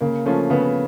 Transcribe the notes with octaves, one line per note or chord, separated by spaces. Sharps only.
C#3 A#3
F3 A3 C#4 F4
C#3 B3